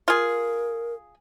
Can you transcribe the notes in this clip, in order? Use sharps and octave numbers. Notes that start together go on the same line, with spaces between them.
F4 G#4 A#4